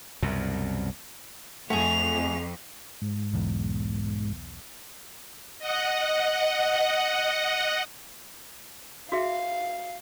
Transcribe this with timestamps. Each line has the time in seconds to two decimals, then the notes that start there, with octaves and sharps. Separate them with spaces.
0.22 C2 F#2 B2
1.70 F2 A3 F#4 G#4 F7
3.02 G#2
3.34 B1 E2
5.59 D#5 F#5
9.12 F#4 G#4 E5 F5